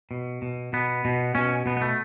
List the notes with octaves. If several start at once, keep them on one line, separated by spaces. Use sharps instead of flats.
B2
B2
B2 B3
B2
B2 C#4
B2 B3
B3
A3